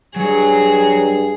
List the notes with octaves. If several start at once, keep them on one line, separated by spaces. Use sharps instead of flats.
G2 F#3 G#4 C#5